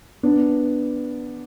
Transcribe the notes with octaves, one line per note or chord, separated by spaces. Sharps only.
B3 D4